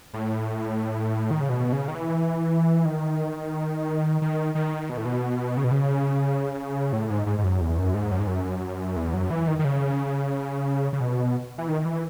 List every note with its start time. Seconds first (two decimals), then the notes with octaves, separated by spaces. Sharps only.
0.14 A2
1.31 D#3
1.41 C#3
1.49 B2
1.73 C#3
1.88 D#3
1.95 E3
2.85 D#3
4.22 D#3
4.55 D#3
4.89 B2
4.97 A2
5.05 B2
5.57 C#3
5.64 B2
5.71 C#3
6.93 A2
7.10 G#2
7.26 G#2
7.38 G#2
7.44 F#2
7.61 E2
7.78 F#2
7.94 G#2
8.11 F#2
8.19 G#2
8.27 F#2
8.96 E2
9.14 F#2
9.30 E3
9.48 D#3
9.59 D#3
9.65 C#3
10.93 C#3
11.00 B2
11.58 E3
11.68 D#3
11.85 E3